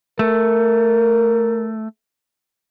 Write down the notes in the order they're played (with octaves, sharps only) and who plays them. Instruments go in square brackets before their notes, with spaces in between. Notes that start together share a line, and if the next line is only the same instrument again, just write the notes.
[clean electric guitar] A3 [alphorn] A#4